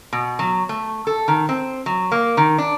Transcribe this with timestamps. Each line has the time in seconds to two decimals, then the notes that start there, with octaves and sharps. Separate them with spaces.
0.13 B2
0.39 F#3
0.69 A3
1.07 A4
1.28 D#3
1.49 C4
1.86 F#3
2.12 A#3
2.37 D#3
2.58 D4